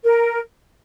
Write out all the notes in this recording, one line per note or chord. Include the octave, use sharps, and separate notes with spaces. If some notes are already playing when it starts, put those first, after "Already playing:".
A#4